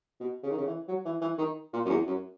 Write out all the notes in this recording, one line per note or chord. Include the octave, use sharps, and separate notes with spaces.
B2
C#3
D#3
C#3
E3
F#3
E3
E3
D#3
A#2
F#2
E2
F#2